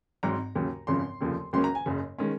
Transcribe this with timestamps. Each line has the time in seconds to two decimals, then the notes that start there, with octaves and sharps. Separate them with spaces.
0.23 G#1 G#2 F#3 C4 A#5
0.55 D#2 C#3 F#3
0.87 G#1 F#2 C#3 F3 C6
1.20 F1 D#2 C#3 F3
1.53 C#2 C#3 F#3 A#3 C#4 C6
1.64 A#5
1.75 G#5
1.86 F#1 F#2 C#3
2.19 D#3 G#3 C#4